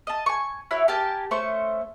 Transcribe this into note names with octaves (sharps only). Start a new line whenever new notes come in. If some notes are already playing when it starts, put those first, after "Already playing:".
D#5 A5
G#5 C#6
E4 F#4 C#5
G4 A#4 G#5 A5
A3 C#4 C5 C#6